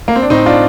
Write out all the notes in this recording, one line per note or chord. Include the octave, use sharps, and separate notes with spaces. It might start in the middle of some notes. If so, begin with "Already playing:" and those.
A#3
C4
D4
A2 C4 D#4
D4 F4